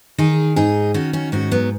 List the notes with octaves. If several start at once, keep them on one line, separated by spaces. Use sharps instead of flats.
D#3 D#4 G#4
G#2 D#4 G#4
D#3 C#4 F#4
C#4 F#4
G#2 C#4 F#4
F#3 B3